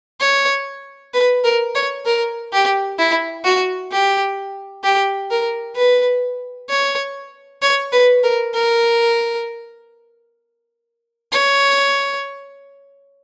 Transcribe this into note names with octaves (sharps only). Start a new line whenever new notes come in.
C#5
B4
A#4
C#5
A#4
G4
E4
F#4
G4
G4
A#4
B4
C#5
C#5
B4
A#4
A#4
C#5